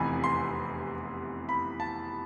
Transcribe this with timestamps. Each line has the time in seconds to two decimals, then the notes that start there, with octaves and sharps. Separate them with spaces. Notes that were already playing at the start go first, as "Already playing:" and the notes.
Already playing: F1 E2 C3 E3 G#5 B5
0.24 C6
1.49 B5
1.80 A5